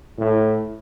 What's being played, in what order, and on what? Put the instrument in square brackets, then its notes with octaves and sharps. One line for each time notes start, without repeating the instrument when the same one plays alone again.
[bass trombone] A2